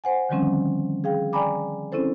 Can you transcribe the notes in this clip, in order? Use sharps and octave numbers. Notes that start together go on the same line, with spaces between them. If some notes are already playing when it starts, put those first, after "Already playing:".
C5 F#5 G#5
D3 D#3 F3 G3 C4 C#4
G#4 F5 G5
D5 G5 G#5 A#5 B5 D6
C4 C#4 E4 A4 C5